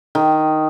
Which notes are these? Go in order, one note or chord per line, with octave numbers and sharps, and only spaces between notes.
D#3